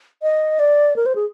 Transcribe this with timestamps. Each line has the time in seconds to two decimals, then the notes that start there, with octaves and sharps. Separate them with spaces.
0.22 D#5
0.59 D5
0.96 A#4
1.06 C5
1.16 G#4